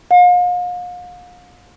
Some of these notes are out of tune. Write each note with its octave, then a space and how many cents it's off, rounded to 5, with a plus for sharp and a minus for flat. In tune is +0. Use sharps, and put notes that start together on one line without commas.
F5 +40